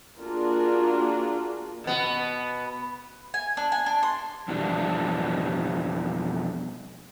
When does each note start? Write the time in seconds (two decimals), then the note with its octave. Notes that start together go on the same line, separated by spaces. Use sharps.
0.20 A#3 D4 F4 F#4 G#4 A#4
1.84 B2 B3
3.34 G#5
3.57 D4
3.72 G#5
3.86 D4
4.03 C6
4.48 F2 B2 E3 G3 D4